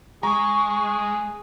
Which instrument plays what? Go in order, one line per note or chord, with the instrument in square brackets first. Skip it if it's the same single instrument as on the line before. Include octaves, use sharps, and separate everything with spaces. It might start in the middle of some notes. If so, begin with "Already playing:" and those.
[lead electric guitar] G#3 [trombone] G#4 [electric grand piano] A#5 [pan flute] C#6